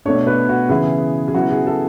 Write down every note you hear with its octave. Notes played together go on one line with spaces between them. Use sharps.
B2 A3 D4 C#5
B4
F#4
C#3 E3 B3 E4 G#4
G#4
C#3 F#3 B3 E4 F#4
G#4
A4